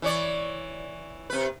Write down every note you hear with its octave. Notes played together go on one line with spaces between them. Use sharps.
E3 C#5 D5
C3 B4